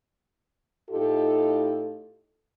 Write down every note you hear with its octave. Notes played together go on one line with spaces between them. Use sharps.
A2 D#4 F4 G4 A4